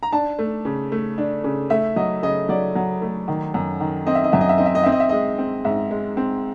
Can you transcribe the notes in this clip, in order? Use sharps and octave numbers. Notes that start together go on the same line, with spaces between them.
A#5
D4 A5
A3
C#3
A3
D4
C#3
A3 E5
F#3 D#5
C#3 D#5
F#3 D5
F#3
A3
D#3
F#2
D#3
C4 D#5
E5
D#5
F#2 E5
D#5
E5
C4 D#5
E5
D#5
C4 E5
D#5
E5
G#3 D#5
C4
G#2 E5
G#3
C4